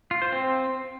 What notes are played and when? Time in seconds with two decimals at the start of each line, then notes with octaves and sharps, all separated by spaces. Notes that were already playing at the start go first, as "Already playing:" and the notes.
0.11 F4
0.22 C5
0.32 C4